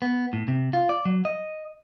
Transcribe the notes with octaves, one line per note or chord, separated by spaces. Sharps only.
B3
A2
C3
F4
D5
F#3
D#5